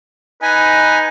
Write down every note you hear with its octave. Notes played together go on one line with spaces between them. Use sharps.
D#4 B4 G#5